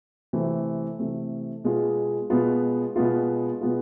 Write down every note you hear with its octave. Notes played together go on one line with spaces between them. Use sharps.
C3 E3 A3 C4
C3 E3 A3 C4
B2 G#3 B3 F4
B2 G#3 B3 F4
B2 G#3 B3 F4
B2 G#3 B3 F4